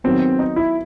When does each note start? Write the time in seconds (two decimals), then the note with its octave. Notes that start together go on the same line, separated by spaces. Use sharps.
0.04 D#3 F#3 B3 C4
0.39 D#4
0.56 E4